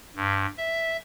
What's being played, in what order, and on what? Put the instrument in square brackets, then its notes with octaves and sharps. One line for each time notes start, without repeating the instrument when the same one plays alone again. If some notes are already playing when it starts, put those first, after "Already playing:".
[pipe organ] G2
E5